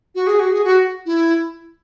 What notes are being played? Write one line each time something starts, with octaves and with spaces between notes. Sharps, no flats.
F#4
G#4
F#4
G#4
F#4
E4